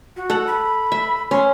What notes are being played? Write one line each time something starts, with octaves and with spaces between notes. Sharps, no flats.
F#4
A4 F#5
B5
E5
C#4 C6